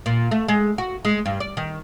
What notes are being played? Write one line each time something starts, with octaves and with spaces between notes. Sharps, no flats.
A#2
A3
G#3
F#4
G#3
G2
D5
D#3